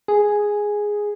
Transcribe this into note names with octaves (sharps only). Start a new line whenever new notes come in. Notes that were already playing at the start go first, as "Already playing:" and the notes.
G#4